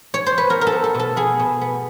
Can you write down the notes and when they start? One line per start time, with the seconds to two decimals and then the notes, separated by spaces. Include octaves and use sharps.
0.14 C#5
0.26 C5
0.38 B4
0.50 B3 A#4
0.61 A#4
0.67 A4
0.72 B3
0.84 A4
0.95 B2 A4
1.16 B3 G#4
1.39 B2
1.61 B3